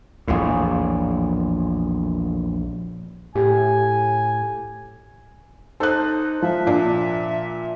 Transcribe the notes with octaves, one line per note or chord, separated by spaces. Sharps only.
A#1 E2 A2
A2 G4 G#5
D#4 A4 C5 F#6
F3 E5
A#2 D4